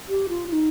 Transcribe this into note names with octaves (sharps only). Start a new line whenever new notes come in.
G4
F4
F4
D#4